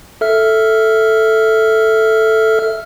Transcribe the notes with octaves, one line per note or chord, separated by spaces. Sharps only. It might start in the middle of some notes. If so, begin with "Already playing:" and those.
A4 E5 F6